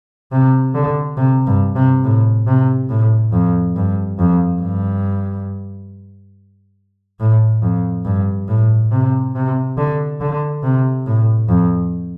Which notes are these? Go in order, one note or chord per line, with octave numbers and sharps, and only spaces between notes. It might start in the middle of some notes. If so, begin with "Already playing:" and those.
C3
D3
C3
G2
C3
A2
C3
A2
F2
G2
F2
G2
A2
F2
G2
A2
C3
C3
D3
D3
C3
A2
F2